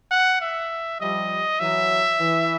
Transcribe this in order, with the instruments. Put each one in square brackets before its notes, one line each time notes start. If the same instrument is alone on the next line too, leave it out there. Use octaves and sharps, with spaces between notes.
[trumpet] F#5
E5
[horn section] F3 G3 [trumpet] D#5
[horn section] E3 F#3 [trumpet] E5
[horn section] E3